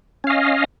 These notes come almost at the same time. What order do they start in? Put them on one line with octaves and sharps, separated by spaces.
C#4 F5 D#5